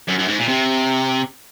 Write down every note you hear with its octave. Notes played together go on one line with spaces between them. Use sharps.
F#2
F#2
G#2
A#2
C3